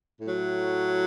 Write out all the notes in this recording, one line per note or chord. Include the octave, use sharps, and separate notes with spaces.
A2 F#3